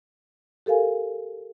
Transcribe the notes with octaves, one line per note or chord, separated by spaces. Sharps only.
G4 A4 A#4 F5 G#5